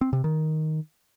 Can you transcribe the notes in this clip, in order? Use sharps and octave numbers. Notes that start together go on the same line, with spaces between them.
C4
C3
D#3